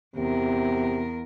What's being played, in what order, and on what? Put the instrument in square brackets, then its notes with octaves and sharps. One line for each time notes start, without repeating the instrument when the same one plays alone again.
[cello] E2 A#4 [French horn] C3